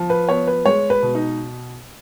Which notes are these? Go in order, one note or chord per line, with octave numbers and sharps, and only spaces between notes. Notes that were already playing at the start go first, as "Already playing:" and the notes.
Already playing: F3
B4
B3 C#5
B4
G#3 C#5
B4
B2
D#4